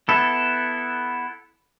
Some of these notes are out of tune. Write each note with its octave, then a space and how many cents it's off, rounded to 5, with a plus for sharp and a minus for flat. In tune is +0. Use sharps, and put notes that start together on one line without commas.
B3 +0 E4 +0 A4 +0